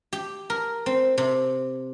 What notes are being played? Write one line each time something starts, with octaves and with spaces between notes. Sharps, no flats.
G4
A#4
C4
C3